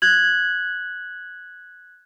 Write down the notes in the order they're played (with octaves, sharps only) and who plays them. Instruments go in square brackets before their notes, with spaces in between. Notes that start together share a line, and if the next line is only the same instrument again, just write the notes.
[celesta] F#6 G#6 F#7